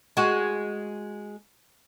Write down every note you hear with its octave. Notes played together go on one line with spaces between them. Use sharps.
G#3 F#4